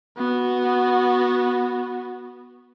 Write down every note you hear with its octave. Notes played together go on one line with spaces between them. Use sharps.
B3 F#4